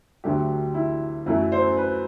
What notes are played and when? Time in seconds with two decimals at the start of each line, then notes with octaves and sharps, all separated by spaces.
0.24 D2 D3 F#3 A3 G4
0.74 E4
1.26 F#2 F#3 A3 E4
1.52 C5
1.77 B4